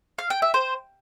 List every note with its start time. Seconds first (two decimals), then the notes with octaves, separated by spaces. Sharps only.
0.19 F5
0.30 G5
0.42 E5
0.54 C5